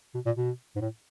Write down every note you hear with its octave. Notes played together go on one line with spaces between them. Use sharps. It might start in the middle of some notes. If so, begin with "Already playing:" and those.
B2
A#2
B2
G#2
A2